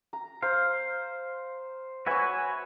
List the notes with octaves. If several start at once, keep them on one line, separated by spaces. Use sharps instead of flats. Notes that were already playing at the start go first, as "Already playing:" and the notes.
A#5
C5 F5
F#4 B4 C#5 E5 G#5